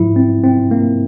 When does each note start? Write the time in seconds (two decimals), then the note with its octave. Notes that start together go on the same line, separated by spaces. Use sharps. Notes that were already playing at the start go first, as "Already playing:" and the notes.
Already playing: G#2 F3 E4
0.16 C4
0.44 C4
0.71 A#3